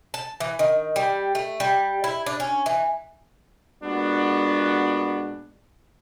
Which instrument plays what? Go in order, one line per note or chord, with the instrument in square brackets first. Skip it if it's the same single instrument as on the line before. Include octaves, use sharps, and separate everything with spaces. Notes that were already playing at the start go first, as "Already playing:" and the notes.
[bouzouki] A5
E3
D#3
G3
A3
G3
E4
D4
C#4
E3
[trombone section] A#2 G#3 B3 D4 F#4